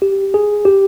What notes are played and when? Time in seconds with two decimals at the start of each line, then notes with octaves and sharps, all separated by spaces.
0.02 G4
0.34 G#4
0.65 G4